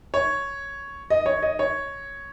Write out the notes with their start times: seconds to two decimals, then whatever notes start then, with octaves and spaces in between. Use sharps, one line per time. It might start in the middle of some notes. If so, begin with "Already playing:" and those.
0.14 C#5
1.10 D#5
1.26 C#5
1.42 D#5
1.59 C#5